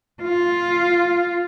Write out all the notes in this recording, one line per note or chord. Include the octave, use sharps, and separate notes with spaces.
F4